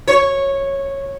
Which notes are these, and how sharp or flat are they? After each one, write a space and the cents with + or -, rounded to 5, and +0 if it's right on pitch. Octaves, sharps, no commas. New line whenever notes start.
C#5 -10